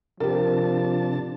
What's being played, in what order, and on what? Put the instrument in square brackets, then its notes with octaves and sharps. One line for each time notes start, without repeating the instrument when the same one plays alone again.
[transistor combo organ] C3 D4 A5 [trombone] F3 [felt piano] G4 A#4